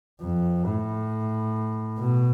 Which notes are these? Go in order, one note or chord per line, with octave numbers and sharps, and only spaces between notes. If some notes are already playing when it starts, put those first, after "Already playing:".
F2
A2
B2